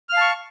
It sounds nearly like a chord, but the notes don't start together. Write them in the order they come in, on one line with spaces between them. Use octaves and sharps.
F6 F5 A5 C#6